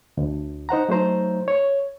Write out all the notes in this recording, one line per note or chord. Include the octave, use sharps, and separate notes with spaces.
D2
D#4 C5 F#5 A#5
F#3 A3 D#4 C5 A#5
C#5